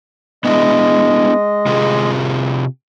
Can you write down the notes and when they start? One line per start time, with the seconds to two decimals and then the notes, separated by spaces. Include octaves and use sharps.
0.45 G#3 B3 D4 E4 D#5
1.66 C3 F4 G#4